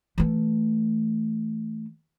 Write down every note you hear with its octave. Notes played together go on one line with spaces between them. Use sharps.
E3 A3